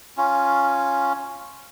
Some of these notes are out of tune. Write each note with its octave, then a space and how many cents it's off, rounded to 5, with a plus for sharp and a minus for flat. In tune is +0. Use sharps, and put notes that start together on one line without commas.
C#4 +0 F4 +0